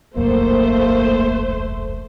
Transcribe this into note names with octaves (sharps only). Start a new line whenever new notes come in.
E1 C2 F#2 A3 A#3 C5